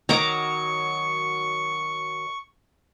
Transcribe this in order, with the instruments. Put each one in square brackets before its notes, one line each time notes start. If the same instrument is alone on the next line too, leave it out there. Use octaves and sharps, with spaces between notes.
[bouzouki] D#3 F#3 [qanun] A#5 D6 [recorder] C#6